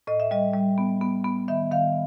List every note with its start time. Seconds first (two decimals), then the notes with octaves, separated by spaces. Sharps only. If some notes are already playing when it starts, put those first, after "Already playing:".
0.07 A2 D#5
0.20 E5
0.31 G3 D#5
0.54 G3
0.78 B3
1.01 B3
1.24 B3
1.48 D#3 E5
1.71 D#3 F5